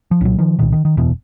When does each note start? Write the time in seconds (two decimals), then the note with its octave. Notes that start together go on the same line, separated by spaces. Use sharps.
0.11 F3
0.21 C2 A#2 F#3
0.38 D#3 F3
0.59 C2 A#2 D#3
0.72 D#3
0.85 D#3
0.97 F#1 E2 B2